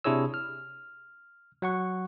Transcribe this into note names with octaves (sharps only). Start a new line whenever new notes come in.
C3 D4 E4 G#4 C#5 E6
F6
F#3 F#5 C#6